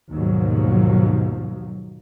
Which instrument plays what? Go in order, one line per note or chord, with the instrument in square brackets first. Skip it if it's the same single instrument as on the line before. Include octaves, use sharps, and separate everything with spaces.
[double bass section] D#2 G#2 B2 F3 F#3